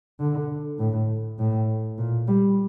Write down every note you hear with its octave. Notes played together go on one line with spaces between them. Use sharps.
D3
A2
A2
A#2
G3